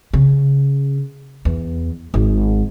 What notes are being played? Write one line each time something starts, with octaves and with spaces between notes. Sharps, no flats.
C#3
E2
G#1